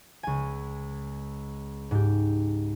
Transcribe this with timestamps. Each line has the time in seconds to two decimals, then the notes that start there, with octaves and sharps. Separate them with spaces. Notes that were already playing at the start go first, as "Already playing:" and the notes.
0.23 C#2 G#5
1.91 G#2 G4